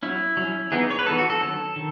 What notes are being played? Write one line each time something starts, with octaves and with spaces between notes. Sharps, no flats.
F#3 C#4 E4
F#3 C#4
E3 B3 D#4 G#4
C#5
B4
E3 B3 D#4 A4
F#4
A4
D#3 F#3 C#4
D#3